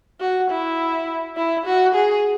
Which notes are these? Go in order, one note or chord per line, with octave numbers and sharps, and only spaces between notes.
F#4
E4
E4
F#4
G#4